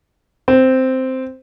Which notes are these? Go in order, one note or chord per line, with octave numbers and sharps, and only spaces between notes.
C4